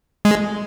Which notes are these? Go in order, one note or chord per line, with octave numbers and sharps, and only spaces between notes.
G#3